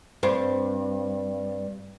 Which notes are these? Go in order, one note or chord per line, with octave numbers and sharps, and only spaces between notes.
G2 C4